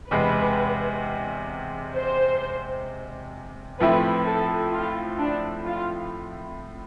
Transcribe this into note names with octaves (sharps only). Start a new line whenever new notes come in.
E2 C3 G#3 B4
C5
A2 F3 A3 C4 E4 B4
A4
F4
D4
F4